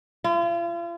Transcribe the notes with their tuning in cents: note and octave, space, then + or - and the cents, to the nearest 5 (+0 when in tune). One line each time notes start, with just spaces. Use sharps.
F4 -40